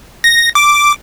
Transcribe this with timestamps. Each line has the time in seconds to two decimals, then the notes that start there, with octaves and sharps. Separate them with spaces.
0.24 A#6
0.55 D6